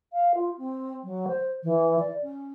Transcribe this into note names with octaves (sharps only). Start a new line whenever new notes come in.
F5
F4
C4
F#3
C5
E3
D5
C#4